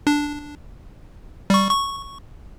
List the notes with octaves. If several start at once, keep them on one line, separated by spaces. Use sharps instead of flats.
D4
G3 C#6
C#6